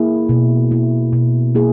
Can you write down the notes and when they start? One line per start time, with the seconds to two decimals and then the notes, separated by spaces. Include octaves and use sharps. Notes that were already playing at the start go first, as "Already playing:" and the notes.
Already playing: A#3 E4 G#4
0.29 B2
0.71 A#3 E4
1.13 B2
1.55 A#3 E4 G#4